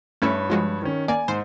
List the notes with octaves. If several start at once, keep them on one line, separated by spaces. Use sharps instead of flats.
G2 A3 C#4 E4 C#5 B5
F3 G#3 F#4
D#3 C#4
A#3 D5 G#5
G#2 C5